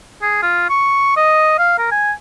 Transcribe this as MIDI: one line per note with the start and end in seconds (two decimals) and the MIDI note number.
0.22 0.39 68
0.43 0.66 65
0.70 1.14 85
1.17 1.58 75
1.59 1.78 77
1.79 1.90 70
1.91 2.12 80